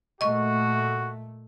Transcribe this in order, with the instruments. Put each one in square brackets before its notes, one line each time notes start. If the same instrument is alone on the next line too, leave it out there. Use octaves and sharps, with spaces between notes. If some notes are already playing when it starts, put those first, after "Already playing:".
[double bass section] A#2 A3 [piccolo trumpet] F#4 [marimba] D#5 C#6